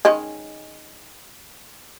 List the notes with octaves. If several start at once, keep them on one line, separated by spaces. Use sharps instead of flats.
D#3 G#3 C#4